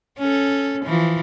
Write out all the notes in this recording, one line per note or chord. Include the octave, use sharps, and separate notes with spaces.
C#4 A4
E3 F3